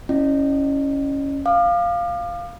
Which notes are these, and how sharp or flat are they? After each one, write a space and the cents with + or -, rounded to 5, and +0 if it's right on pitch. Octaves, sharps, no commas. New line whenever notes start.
C#4 +0 E4 -5 D#5 -35
F5 +0 D6 +40